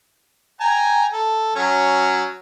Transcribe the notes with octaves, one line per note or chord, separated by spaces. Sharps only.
G5 G#5 A#5
A4
F#3 C#4